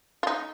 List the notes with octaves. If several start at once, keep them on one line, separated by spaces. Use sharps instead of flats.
F4
D#4